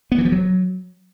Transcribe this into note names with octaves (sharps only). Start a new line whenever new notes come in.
B3
E3
F3
F#3